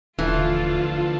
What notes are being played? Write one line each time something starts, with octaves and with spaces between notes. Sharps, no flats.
D#1 D3 E3 F3 A3 F4